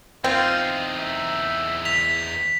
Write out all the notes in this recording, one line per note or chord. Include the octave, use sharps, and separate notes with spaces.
E2 C4 D#4 F4
E5
B6 F7